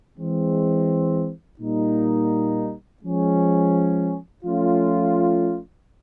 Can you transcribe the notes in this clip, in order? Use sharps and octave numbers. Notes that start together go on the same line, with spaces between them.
E3 G#3 C4
A#2 G3 A#3 D#4
F3 G#3 C#4
F3 A3 C#4 F4